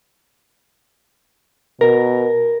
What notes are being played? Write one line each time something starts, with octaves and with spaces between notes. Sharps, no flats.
B2 A#4